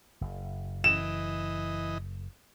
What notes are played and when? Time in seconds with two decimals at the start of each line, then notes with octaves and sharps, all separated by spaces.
0.21 F#1
0.84 E3 D#5 E7